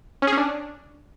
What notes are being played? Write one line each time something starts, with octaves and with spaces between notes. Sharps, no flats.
C#4
G#4
C#4
D4